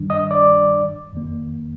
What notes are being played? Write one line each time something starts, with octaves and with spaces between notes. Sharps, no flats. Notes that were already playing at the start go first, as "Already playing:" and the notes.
Already playing: G2 D#3 G3 D4
D#5 D#6
D5 D6
F2 D#3 A#3